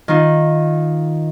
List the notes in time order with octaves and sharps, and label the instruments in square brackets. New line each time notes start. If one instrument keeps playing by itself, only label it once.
[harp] D#3 F4